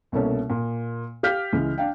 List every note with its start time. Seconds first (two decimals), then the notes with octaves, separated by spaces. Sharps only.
0.12 C2 B2 A#3 C#4 A4 C#5
0.50 A#2
1.23 G4 F5 F6 G6 B6
1.52 C#2 E3 G#3
1.78 D4 F5 G5